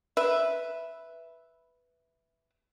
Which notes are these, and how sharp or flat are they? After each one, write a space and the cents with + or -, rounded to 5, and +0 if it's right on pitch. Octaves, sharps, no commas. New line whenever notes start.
B4 +0 E5 +0